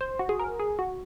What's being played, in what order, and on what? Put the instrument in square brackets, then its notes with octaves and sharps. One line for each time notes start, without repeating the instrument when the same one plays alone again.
[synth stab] C5
F#4
G#4
A#4
G#4
F#4